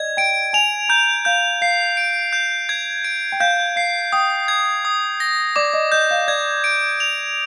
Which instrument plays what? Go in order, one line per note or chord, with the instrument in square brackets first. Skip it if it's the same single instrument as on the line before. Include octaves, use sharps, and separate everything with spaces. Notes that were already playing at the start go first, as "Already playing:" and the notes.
Already playing: [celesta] D5 D#5 [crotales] G#6
[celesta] G5 [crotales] D7
[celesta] G#5 [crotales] F7
[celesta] A#5 [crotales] G6
[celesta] F5 [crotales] G6
[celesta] F5 [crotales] C7
[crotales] D7
G6
G#6
D7
[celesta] G5
[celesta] F5 [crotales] G6
[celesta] F5 [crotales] C7
[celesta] G5 [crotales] D#6
[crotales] G#6
D#6
A#6
[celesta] D5 [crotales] D6
[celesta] D#5
[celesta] D#5 [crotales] G6
[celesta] F5
[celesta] D5 [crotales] G#6
[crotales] D7
F7